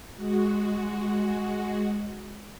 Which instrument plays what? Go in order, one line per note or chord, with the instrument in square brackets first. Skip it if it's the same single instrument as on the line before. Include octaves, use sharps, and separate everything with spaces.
[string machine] G#3 F#4